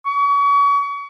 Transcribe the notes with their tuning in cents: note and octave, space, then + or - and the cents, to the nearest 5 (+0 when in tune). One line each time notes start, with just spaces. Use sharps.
C#6 +35